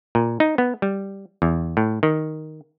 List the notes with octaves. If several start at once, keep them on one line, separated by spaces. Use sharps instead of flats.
A#2
D#4
B3
G3
E2
A2
D#3